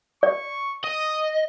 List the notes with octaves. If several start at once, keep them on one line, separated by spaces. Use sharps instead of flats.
D5 C#6
D#5 D#6